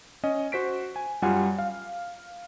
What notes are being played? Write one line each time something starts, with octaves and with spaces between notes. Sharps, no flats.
C#4 D#5
F#4 C5 B6 D7
G#5
F#2 G3 F4 F#5 G#5
F5